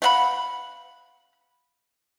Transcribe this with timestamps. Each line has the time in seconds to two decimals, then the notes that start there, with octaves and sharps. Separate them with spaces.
0.02 A3 F5 F#5 B5